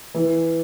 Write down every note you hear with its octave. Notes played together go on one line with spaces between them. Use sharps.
E3